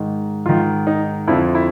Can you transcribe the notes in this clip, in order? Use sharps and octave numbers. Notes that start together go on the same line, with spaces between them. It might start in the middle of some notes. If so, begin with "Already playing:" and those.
Already playing: G#2 D#3
G#2 D#3 F4
D#4
F2 D3 F3 E4
E4